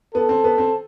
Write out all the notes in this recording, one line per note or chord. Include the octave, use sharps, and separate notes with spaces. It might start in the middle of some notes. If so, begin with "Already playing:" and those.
B3 A4
C4
B3
C4